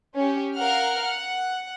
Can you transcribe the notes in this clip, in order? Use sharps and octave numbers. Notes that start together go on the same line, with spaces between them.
C#4 G4
A#4 F5 F#5 F6
F#5